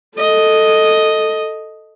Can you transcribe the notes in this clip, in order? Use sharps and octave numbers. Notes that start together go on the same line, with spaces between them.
A4 D#5